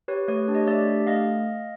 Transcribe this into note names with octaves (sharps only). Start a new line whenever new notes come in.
G4 B4 C#5
A3 B4 C#5
D4 G4
C#5 D#5
A3 D5 E5
D4 G4
A3 D#5 F5